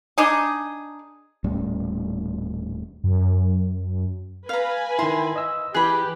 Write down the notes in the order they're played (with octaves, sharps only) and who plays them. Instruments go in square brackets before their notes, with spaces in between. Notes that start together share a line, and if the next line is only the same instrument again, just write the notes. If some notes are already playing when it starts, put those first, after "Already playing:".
[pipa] D4 D#4 G#4
[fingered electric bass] D#1 A2 G3 C#4
[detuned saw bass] F#2
[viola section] B4 G#5 [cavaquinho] F5 A#5
[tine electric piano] D#3 E4 [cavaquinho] C5 A#5
[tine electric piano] D#5 E6
[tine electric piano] E3 F#6 [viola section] G4 [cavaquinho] G#4 B5